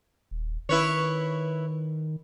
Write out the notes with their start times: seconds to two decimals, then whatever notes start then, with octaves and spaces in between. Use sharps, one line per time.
0.31 D#1
0.69 D#3 E4 B4 C#5